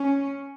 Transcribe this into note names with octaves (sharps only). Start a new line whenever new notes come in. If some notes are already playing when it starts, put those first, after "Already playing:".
Already playing: C#4